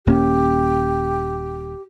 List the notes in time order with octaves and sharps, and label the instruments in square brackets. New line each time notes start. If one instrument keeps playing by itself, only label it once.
[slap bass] D#1 A#3 C#4 [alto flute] G4